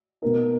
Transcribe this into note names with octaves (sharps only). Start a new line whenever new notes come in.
B2 A#3 D#4 A#4